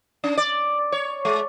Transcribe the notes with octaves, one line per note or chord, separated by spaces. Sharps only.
C#4
D5
C#5
G#3